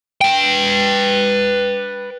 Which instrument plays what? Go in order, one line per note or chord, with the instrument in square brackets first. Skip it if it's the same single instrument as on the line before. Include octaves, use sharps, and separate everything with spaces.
[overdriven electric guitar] B4 G5